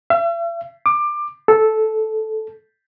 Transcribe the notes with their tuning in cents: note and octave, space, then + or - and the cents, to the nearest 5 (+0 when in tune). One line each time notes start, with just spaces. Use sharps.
E5 +45
D6 +20
A4 -10